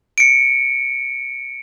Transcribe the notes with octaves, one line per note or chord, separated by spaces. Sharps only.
C#7 D7